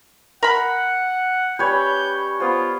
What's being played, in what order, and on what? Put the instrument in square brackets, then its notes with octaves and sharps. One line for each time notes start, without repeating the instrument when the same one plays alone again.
[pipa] A#4 B5 [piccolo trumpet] F#5
[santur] G3 C#4 [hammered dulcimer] B4 C#5 [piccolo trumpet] G6
[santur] B3 C5 [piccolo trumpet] F4